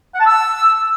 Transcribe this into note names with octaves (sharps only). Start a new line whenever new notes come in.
F#5
A5
E6